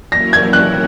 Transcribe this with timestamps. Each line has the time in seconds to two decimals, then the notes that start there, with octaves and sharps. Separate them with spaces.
0.12 F#3 A#3 C#4 E4 A#4 A#6
0.33 G#6
0.53 F#6